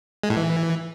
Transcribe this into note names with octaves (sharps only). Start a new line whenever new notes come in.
G#3
A2
E3